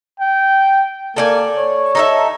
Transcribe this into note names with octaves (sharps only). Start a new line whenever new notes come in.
G5
A#3 A4 D5 G#5
C#5
D#4 A4 E5